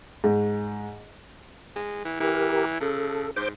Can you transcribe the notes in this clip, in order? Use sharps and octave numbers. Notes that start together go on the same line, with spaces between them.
G#2
G#3
E3
E3 G4 A#4
C#3 A4
G#2 C5 D6 G6